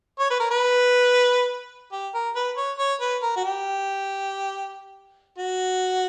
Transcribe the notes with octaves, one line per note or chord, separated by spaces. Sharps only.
C#5
B4
A#4
B4
G4
A#4
B4
C#5
C#5
B4
A#4
F#4
G4
F#4